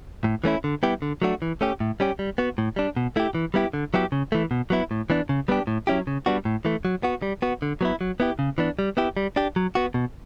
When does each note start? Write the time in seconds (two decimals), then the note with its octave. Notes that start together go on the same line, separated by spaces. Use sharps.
0.24 A2
0.44 E3 A3 C#4 E4
0.64 D3
0.83 G3 B3 E4 G4
1.02 D3
1.22 F#3 A3 D4 F#4
1.42 E3
1.61 A3 C#4 G4
1.80 A2
2.00 G3 C#4 G4
2.19 G3
2.38 B3 F#4
2.58 A2
2.76 G3 D4
2.97 B2
3.16 A3 E4 G4
3.35 E3
3.54 G3 B3 E4 G4
3.73 D3
3.94 F#3 B3 E4 G4
4.12 C#3
4.32 E3 A3
4.51 B2
4.70 F#3 B3 E4
4.91 A2
5.10 E3 B3 D4
5.29 C#3
5.48 G3 B3 D4 G4
5.67 A2
5.87 F#3 C#4 E4 G4
6.07 C#3
6.26 G3 B3 D4 F#4
6.45 A2
6.65 E3 A3
6.85 F#3
7.03 B3 F#4
7.22 G3
7.42 B3 F#4
7.62 D3
7.81 F#3 B3 E4
8.01 F#3
8.20 B3 E4 G4
8.39 C#3
8.58 E3 B3 D4
8.79 G3
8.97 B3 E4 G4
9.17 G3
9.36 D4 G4
9.56 F#3
9.75 B3 F#4
9.94 B2